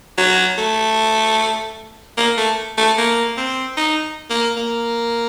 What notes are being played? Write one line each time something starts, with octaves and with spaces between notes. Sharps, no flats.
F#3
A3
A#3
A3
A3
A#3
C4
D#4
A#3
A#3